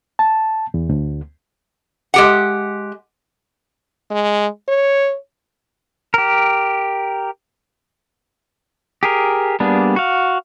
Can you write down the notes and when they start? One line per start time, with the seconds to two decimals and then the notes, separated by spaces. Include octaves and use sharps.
0.19 A5
0.74 E2
0.89 D2
2.14 G#3 G4 F#5
4.11 G#3
4.68 C#5
6.14 G4 A#4
9.03 G4 G#4 A#4
9.60 G3 A#3 B3 D4 G#4
9.96 F#4 F5